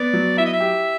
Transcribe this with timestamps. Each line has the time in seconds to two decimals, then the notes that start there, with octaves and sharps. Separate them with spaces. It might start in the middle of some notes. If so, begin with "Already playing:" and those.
Already playing: B3 D5
0.13 F#3
0.37 E4 E5
0.46 D#5
0.53 E5
0.60 G4